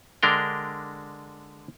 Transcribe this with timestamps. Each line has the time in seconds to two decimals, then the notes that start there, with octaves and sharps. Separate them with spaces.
0.23 D3 G#3 D4 A#4 G5